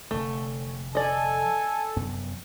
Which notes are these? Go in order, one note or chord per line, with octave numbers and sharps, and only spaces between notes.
F1 D3 A3
A4 D5 D#5 G#5
F1 F#2 B3